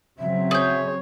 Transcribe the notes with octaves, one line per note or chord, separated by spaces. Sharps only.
C#3 F#3 C4 E5
G#4 C#5 G6